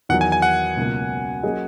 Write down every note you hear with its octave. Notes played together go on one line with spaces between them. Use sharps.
E2 D#3 F#3 F#5
G#5
G#5
F#5
C#2 B2 F#3 A#3
F#3 A#3 C#4 G#4 D#5